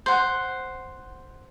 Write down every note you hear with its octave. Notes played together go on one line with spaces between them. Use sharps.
C5 F#5